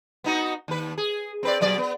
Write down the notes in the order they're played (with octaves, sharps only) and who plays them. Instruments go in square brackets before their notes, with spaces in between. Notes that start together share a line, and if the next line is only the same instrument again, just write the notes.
[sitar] B3 D#4 F#4
D#2 B4
G#4
C4 B4 D5
B2 F#3 D5
B3